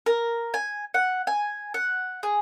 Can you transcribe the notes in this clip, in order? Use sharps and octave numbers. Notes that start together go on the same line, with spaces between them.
A#4
G#5
F#5
G#5
F#5
G#4